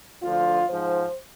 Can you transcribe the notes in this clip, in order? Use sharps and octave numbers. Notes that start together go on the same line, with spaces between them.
D2 D3 F3 F4
G#2 F3 C5